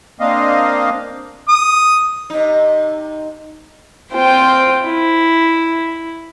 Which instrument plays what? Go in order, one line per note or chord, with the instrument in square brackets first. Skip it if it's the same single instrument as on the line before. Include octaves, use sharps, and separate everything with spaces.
[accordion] A#3 C4 D4 D#5 F5
[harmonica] D#6
[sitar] C3 D#4
[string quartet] C4 F4 C5 G5
E4